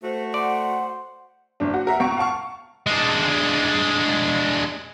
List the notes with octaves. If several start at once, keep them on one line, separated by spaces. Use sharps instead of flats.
A3 F#4 C5
C5 D5 F#5
F#1 D4
F#4
A#4 E5 F#5
C#2 A#5 C#6 D7
F5 F#5 A5 C#6 F6
G#3 D4